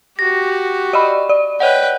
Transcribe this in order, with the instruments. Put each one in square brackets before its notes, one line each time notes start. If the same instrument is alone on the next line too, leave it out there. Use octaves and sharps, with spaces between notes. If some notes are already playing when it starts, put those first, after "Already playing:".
[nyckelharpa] F#4 G4 [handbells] A#6
[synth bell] D5 D#5 B5
D5
[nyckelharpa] B4 G5 [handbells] C#5 D#5 F#5